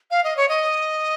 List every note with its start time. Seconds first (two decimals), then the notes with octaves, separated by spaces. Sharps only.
0.11 F5
0.24 D#5
0.37 C#5
0.49 D#5